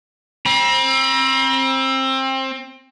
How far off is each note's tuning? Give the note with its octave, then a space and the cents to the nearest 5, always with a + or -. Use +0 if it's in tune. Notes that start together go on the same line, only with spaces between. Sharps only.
C4 +25 B5 -40